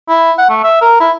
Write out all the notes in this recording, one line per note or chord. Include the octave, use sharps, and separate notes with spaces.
E4
F#5
A3
E5
A#4
E4